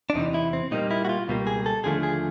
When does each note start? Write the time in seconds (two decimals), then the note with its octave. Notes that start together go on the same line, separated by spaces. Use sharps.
0.10 D4
0.15 E2 C3 E3 D#4
0.34 E4
0.53 C4
0.71 A#2 G3 A#3 D#4
0.91 E4
1.05 F#4
1.09 F4
1.28 C#2 B2 G3 A#3
1.47 G#4
1.66 A4
1.84 D#2 D3 F3 A3 G#4
2.03 G#4